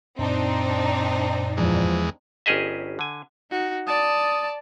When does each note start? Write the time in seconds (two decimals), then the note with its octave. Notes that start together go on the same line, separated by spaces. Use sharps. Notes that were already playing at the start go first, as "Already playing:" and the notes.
0.19 F#2 A#2 C4 D4 D#4 D5
1.57 E2 F3 G#3
2.46 G1 C#4 G4 G#4 D#5 E5
2.99 D3 G#5
3.51 D#4 F#4
3.87 D5 A5 D#6